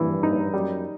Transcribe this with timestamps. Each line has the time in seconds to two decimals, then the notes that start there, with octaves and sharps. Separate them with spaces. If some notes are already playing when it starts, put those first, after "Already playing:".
Already playing: G2 E3
0.23 D#4
0.53 F#2 G3